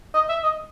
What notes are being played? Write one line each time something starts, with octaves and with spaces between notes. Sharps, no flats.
D#5
E5
D#5